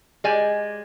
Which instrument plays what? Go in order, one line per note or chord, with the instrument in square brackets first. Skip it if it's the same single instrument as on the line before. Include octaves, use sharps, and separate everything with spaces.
[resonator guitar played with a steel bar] G#3 G4 D5 G#5